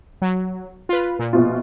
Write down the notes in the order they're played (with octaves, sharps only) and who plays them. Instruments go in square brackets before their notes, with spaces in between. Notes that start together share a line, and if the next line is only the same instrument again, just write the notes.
[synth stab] F#3
F4 B4
A#2
[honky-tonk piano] A#1 B2 F4